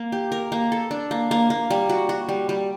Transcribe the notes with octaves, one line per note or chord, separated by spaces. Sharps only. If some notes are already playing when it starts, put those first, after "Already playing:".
Already playing: A#3 A#4
G4
A#4
A#3
A4
D4
A#3
A#3
A#3
G3
F#4
F#4
G3
G3